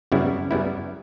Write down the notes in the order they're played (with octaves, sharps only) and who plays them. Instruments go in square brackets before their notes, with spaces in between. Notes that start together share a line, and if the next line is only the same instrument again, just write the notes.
[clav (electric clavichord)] F#2 C#3 G3 B3 E4
F#2 C#3 G3 B3 E4